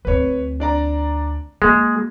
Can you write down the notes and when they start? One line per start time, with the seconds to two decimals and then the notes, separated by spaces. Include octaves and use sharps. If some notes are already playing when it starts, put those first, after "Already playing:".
0.05 D2 C4 B4 C#5
0.60 D4 D5 A#5
1.62 G#3 A#3 G#4